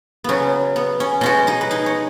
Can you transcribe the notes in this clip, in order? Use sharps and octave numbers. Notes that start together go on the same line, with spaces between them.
C#3 F#3 B3 C#4
B3
C#4
B2 G#3 C#4 F#4
D#4 G#4
B4
D#4 G#4
C#5